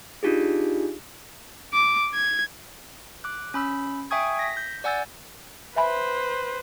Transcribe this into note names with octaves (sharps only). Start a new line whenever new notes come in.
D4 D#4 F4 G4 G#4
D6
G#6
D6 F#6
C#4 B5 E6
E5 G5 G#5 C#6 D#6 G#6
A#6 B6
G6
D5 F#5 G#5 E6 G6 A6
B4 C5 E5 G#5 B5